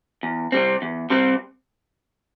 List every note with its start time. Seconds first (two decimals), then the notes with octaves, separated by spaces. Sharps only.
0.23 E2
0.52 C3 G3 C4
0.82 E2
1.10 C3 G3 C4